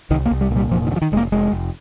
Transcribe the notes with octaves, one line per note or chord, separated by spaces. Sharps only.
C2 D#3
A#3
C2
G3
A#2
G3
F1 F3
D#3
D3
F3
D#3
F1 G#3
A#3
F1 G#3
F1